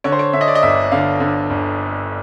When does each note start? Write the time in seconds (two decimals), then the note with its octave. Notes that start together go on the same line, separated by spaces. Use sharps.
0.04 D3 C#5
0.12 C5
0.19 C#5
0.33 D3 E5
0.41 D#5
0.48 D5
0.55 D#5
0.63 G1 E5
0.92 D3 F5
1.20 D3
1.50 G1